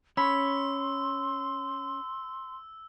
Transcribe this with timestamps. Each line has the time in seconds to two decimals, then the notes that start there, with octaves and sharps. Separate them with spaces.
0.17 C#4 C#5 B5 C6 E6